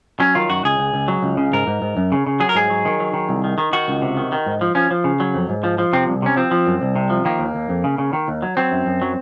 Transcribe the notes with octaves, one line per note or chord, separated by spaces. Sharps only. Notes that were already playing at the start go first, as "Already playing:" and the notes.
F#3 C#4
D#3 F4
F#2 F#4
C#2 G#4
C#2
C#2
F#3
C#2
C#3
G#2 A#4
G#2
G#2
F#2
C#3
C#3
F#3 G#4
A#4
G#2 G#4
F#3
D#3
F#3
D#3
C2
D#3
D#3
D#3 F#4
C#2
C3
D#3
D#3
G#2
F3
F3 C#4
F3
C#3
F#3
F2
G#2
F3
F3
C3 C4
C2
C3 C#4
F3 C4
F3
F#2
C2
C3
F3
D#3 A#3
D#2
D#2
F2
C#3
C#3
D#3
D#2
F#3
F#3 C4
F#2
F#2
F#3